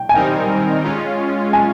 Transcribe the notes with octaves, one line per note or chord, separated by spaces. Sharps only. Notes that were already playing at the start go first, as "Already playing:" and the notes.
Already playing: G5
G#5
D#3 G3 C4 D#4 A#4 G5
G#3 C#4 F4
G#5